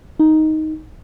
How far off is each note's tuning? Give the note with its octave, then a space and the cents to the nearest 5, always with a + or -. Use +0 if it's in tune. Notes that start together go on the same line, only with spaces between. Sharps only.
D#4 +5